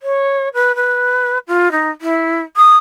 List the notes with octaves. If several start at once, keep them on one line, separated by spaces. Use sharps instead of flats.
C#5
B4
B4
F4
D#4
E4
D#6